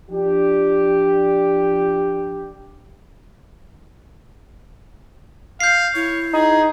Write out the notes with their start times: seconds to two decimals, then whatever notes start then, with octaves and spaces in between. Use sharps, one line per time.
0.10 F3 D4 G4
5.60 F5 G6 C7
5.95 E4 C#5
6.34 D#4 G#4